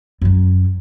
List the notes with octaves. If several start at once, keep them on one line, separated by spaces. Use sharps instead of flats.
F#2 F#3